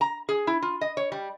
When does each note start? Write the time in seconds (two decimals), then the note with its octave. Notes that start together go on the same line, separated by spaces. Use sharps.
0.01 A#5
0.29 G#4
0.47 E4
0.63 F4
0.81 D#5
0.97 C#5
1.12 G3